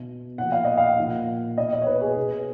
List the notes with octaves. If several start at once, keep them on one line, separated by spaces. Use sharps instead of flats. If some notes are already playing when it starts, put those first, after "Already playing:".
Already playing: B2
A#2 F3 F#5
F5
D#5
F5
A#2 F3
B2 D#5
D#5
C#5
B4
G#4
B2